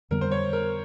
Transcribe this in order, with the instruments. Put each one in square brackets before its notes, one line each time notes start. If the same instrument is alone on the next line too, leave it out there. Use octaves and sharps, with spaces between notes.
[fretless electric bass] F2 D3 G3 B3 [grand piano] A#4
[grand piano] C5
C#5
A#4